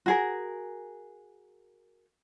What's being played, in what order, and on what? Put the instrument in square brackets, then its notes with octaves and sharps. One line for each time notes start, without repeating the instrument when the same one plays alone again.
[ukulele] F#4 G#4 A#4